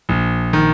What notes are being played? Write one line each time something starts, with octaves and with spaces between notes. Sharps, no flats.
A#1
D#3